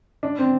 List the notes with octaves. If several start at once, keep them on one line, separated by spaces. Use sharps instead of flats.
D4
C4